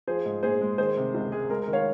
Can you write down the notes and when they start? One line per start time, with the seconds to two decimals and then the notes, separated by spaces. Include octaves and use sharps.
0.07 F3 G#4 C5
0.26 G#2
0.43 A#1 G#4 C5
0.61 G#3
0.78 D#3 G#4 C5
0.97 C3
1.14 C#2
1.32 G#3 G#4
1.49 G#3 A#4
1.62 A#4
1.68 D#3
1.73 C#5 F5